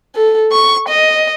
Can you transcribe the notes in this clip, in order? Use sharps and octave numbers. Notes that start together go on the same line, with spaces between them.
A4
C#6
D#5